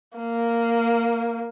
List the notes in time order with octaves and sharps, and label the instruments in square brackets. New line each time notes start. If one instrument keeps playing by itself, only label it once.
[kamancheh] A#3